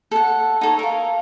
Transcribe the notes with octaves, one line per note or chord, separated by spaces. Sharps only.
A4 F#5
D#4 A4 C#5
A#4 F5